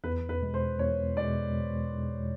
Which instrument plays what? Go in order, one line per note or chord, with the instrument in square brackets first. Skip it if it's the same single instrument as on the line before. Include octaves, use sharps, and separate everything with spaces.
[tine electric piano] E2 [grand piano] B4
[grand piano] B4
[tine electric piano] B2 G#3
[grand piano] C5
[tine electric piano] E2 [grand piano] C#5
[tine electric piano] B2 G#3 [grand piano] D5